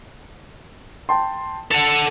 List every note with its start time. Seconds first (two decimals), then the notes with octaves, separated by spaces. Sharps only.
1.09 G5 A5 C6
1.71 A4 F#5 F7